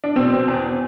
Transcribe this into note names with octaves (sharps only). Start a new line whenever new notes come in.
D4
B2 C4
B2
E2